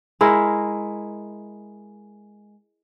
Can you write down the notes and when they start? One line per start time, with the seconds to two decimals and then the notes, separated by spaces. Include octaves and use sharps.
0.21 G#3 E4 A#4